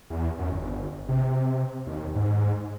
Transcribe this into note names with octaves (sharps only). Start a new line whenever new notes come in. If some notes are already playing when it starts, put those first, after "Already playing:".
E2
F#2
G1
C3
D#2
G#2